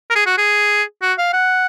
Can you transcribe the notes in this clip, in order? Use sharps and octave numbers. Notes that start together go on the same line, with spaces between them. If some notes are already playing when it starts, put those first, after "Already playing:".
A#4
G#4
F#4
G#4
F#4
F5
F#5